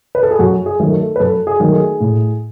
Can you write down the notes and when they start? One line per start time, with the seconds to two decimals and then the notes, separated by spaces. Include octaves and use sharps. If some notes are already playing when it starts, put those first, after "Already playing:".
0.15 B4
0.23 A4
0.31 G#4
0.39 F#2 F#4
0.66 G#4
0.79 D#3 F#3 A3
0.93 A4
1.16 B4
1.20 F#2 A4
1.47 G#4
1.60 D#3 F#3 A3
1.73 G#4
2.00 A2